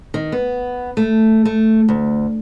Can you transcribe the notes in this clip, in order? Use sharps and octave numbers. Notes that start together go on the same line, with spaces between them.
D#3
B3
A3
A3
D2